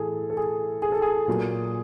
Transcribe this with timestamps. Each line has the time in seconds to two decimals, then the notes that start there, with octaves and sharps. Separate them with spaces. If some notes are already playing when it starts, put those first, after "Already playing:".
Already playing: A2 E3 G#4 A4
0.30 A4
0.37 G#4
0.82 G#4
0.92 A4
1.02 G#4
1.28 A#2 F#3